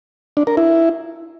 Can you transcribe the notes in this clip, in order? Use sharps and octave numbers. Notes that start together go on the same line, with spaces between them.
D4
A#4
E4